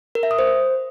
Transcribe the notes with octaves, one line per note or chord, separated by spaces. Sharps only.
A#4
E5
D#6
C5